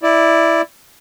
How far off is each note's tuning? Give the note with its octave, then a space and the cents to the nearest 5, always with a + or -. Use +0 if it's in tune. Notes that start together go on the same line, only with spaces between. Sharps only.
E4 +0 D5 +5